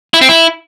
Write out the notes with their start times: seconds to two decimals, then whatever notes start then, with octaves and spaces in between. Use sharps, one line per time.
0.14 E4
0.21 C4
0.29 E4